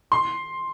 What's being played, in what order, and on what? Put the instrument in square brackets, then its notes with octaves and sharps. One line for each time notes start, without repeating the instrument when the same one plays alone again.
[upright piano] C6